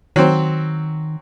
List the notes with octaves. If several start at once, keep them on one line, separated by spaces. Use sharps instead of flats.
D#3 F#3 C4